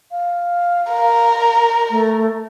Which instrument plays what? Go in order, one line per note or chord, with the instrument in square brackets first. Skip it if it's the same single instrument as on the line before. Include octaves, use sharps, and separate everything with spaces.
[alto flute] F5
[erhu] A#4
[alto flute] A3